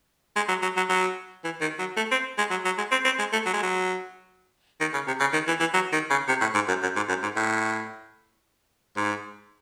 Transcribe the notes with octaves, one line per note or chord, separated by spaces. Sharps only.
G#3
F#3
F#3
F#3
F#3
E3
D#3
F#3
A3
C4
G#3
F#3
F#3
G#3
C4
C4
G#3
A3
F#3
G#3
F#3
D#3
C#3
C3
C#3
D#3
E3
E3
F#3
D#3
C#3
C3
A2
G#2
F#2
F#2
G#2
F#2
G#2
A2
G#2